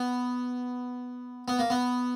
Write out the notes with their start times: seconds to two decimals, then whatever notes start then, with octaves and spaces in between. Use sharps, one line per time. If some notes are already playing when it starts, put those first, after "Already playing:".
Already playing: B3
1.48 B3
1.59 A#3
1.70 B3